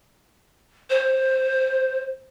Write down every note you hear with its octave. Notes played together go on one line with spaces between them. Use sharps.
C5